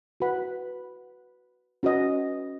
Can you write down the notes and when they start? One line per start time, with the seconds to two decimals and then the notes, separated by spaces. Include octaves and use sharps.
0.20 F#4 B4 F#5 B5
1.83 C#4 F#4 B4 D#5